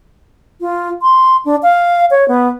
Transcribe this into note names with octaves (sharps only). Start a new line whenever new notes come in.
F4
C6
D4
F5
C#5
B3